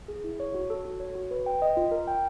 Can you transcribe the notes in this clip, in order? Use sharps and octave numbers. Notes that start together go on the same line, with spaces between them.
G#4
E4
C#5
F#4
A4
F#4
C#5
F#4
B4
G5
D#5
F4
A#4
G5